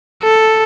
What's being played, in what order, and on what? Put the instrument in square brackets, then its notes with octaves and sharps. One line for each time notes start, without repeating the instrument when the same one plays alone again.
[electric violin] A4